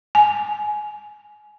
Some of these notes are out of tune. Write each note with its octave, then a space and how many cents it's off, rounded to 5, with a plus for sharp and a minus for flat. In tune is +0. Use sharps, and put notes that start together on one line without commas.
G#5 +20